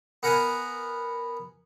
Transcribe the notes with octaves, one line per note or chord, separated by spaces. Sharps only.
B3 A#4 F#5 G#5